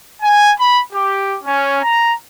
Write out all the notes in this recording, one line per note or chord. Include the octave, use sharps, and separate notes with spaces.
G#5
B5
G4
C#4
A#5